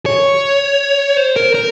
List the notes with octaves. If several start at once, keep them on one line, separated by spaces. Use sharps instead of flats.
C#5
C5
A#4
A#4